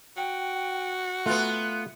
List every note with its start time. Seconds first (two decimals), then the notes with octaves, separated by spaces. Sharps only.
0.17 F#4 G5
1.26 A3 B3 F4 F#6